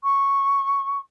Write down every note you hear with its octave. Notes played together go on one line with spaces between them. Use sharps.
C#6